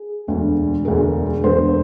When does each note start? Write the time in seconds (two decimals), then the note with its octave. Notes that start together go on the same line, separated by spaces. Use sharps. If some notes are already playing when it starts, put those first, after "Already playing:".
Already playing: G#4
0.27 E1 D2 D3
0.85 E1 D2 D3 G#4 A#4
1.43 E1 D2 D3 A#4 C5